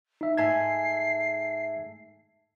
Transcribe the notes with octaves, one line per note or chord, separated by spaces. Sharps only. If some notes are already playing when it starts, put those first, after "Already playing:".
D#4 E5
G#2 A3 E5 G#5 A5 G#6 C7